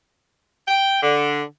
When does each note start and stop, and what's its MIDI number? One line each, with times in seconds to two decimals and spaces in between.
0.67 0.99 79
1.02 1.42 50